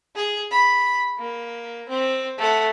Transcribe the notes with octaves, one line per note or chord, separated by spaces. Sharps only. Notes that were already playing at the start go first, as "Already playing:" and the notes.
G#4
B5
A#3
C4
A3 F#5